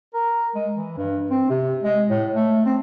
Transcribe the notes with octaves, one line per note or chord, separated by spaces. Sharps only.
A#4
G#3
E3
G2
C4
C3
G#3
A2
A3
C4